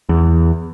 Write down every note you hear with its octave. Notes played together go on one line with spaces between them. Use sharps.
E2